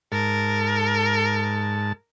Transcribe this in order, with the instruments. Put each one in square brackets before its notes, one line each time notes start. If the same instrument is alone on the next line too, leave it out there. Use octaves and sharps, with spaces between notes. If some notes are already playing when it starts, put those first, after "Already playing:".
[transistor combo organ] G#2 A5 [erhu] A#4